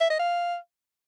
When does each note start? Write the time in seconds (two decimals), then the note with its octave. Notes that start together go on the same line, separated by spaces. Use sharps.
0.01 E5
0.10 D#5
0.19 F5